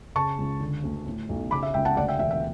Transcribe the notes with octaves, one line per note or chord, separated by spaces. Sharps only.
C#3 A5 C#6
C#2
D3
D2
A2
B1
C#3 B5 D6
E5
C#2 E5 G5
F#5 A5
D2 D5 F#5
E5 G5
E1 E5
E5